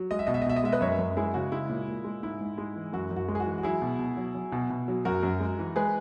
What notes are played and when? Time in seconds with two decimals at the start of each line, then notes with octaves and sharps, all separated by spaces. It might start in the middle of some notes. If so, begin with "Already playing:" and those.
Already playing: F#3
0.11 G#3 D#5
0.19 E5
0.27 B2 D#5
0.34 E5
0.42 D#5
0.46 B2 E5
0.56 D#5
0.64 G#3 E5
0.72 B4 D#5
0.81 F#2 C#5 E5
0.99 F#2
1.17 G#3 E4 G#4
1.34 C#3 F#4
1.52 G#3 E4
1.69 A#2
1.87 A#2
2.04 G#3
2.23 G#2 E4
2.40 G#2
2.58 G#3
2.76 E3
2.93 F#2 F#4
3.11 F#2
3.16 F#4
3.28 G#3
3.35 G#4
3.40 F#4
3.46 E3
3.58 F#4
3.63 F#3 E4 G#4
3.82 B2
3.99 B2
4.17 F#3
4.35 F#3
4.52 B2
4.70 B2
4.88 F#3
5.05 F#2 F#4 A#4
5.23 F#2
5.40 G#3
5.59 E3
5.76 G#3 G#4 B4